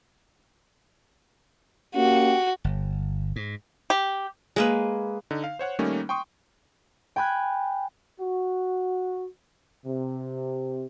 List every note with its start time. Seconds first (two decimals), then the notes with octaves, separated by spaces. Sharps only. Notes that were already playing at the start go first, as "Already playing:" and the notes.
1.95 A#3 C#4 F#4 G4
2.64 G1
3.36 G#2
3.90 G4
4.56 G#3 A#3 B4
5.31 D3 D#4
5.44 F5
5.59 C5 C#5 F#5 F#6
5.79 D#3 G3 A3 A#3 C#4 D#4
6.09 G5 C6 C#6 D#6
7.16 G5 G#5 B5 F#6 G#6
8.20 F#4
9.85 C3